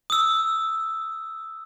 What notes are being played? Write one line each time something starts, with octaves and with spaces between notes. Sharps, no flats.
D#6 E6